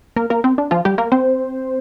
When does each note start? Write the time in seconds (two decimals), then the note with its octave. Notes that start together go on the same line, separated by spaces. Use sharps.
0.16 A#3 A#4
0.30 A#3 A#4
0.44 C4
0.58 D4
0.71 F3 F4
0.85 G3 G4
0.98 A#3 A#4
1.12 C4 C5